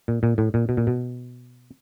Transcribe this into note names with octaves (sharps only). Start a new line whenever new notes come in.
A#2
A#2
A2
A#2
B2
A#2
B2